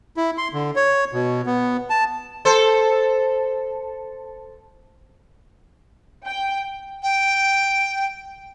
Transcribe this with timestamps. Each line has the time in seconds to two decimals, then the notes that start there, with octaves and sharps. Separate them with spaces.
0.17 E4
0.38 C6
0.54 D3
0.76 C#5
1.13 B2
1.46 B3
1.90 A5
2.45 A4 C5
6.25 G5
7.03 G5